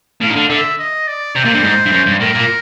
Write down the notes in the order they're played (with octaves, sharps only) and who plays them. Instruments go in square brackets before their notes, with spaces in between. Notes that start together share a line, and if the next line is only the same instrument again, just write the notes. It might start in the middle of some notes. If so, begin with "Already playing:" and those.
[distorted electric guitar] A2 [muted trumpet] F5
[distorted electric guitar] D#3
D3
[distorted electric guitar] D3 [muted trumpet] E5
[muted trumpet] D#5
D5
[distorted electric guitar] C3 [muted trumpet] C5
[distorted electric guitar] A#2
G2
G#2
G2
F#2
G2
[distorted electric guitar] A2 [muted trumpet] A#4
[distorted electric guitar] A#2